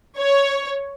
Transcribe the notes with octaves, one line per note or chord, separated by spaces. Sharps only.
C#5